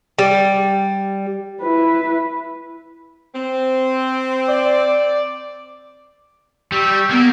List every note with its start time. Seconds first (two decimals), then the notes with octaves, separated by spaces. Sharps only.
0.19 G3
1.61 E4 B4
3.34 C4
4.49 D5
6.72 G3 G4 C#6 E6
7.10 A#3 B3